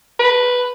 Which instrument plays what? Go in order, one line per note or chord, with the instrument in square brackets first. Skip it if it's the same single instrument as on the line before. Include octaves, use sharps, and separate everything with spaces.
[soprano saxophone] B4